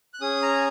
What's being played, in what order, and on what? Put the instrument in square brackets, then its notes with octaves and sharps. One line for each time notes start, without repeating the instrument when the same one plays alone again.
[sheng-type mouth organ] F#6
C#4 G#4 D#6
A#5